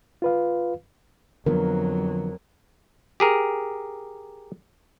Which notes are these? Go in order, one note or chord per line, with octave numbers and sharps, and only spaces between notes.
F4 B4 F5
F2 D3 F3 F#3 B3 A#4
G4 G#4 A#4